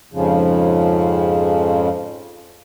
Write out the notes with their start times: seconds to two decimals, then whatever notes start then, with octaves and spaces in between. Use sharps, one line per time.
0.13 F2 G#2 C#3 F3